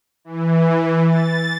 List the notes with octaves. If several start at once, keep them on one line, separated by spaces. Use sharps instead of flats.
E3
A6